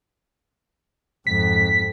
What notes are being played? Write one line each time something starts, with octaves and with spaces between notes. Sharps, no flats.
F2 G#2 B6